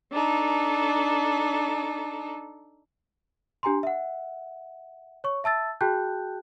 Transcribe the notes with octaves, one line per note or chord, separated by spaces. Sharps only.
D4 D#4 A4
D4 G4 G#5 A#5 C6
E5 F#5
C#5 C#6
E5 A5 E6 A6
F#4 G#4 G5 A5 F#6 G6